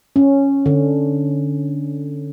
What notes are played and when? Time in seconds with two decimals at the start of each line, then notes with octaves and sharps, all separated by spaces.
0.16 C#4
0.66 D3